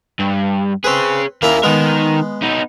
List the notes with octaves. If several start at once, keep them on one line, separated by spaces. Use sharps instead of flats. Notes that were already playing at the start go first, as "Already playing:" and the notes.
G2
C4 G#4 B4 C#5
D#2 A#3 C#4 E4 A#4
D#3 G#3 B3 A#4
B3 D#4